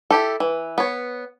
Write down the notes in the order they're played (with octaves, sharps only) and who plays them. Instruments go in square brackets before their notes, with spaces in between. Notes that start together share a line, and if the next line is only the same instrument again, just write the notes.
[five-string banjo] E4 G4 A4
E3
B3 C#5